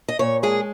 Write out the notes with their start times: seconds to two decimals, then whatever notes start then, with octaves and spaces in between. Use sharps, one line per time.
0.08 D#5
0.19 A#2 C#5
0.43 G#3 G#4